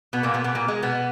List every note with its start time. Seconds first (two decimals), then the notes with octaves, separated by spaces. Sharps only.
0.13 B2 B3
0.23 A#2 A#3
0.34 B2 B3
0.44 B2 B3
0.55 A#2 A#3
0.68 G#3
0.82 B2 B3